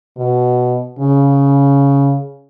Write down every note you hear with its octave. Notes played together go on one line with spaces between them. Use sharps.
B2
C#3